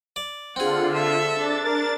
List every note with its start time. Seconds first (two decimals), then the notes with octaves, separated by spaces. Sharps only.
0.16 D5
0.56 D3 C4 F4 G#4 F#5
0.92 A4 E5
1.32 D4 A6
1.63 A#4